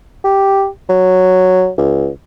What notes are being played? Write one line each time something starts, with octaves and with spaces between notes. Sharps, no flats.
G4
F#3
C#2